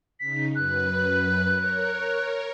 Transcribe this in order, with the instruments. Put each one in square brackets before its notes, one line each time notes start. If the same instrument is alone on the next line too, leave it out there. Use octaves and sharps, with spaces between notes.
[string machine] C#3 D#4 [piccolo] B6
[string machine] F#2 B4 [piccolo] F#6
[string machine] A#4 C#5